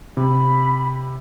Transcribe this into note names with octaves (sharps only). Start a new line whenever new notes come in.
C3 B5